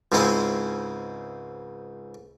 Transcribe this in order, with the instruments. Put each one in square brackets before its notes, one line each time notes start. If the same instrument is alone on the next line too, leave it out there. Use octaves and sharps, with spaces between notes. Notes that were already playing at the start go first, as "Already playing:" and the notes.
[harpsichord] C#2 G#2 C#3 C4 E4 D#5